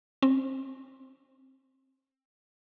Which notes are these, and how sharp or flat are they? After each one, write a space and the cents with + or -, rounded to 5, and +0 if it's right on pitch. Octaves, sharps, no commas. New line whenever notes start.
C4 +20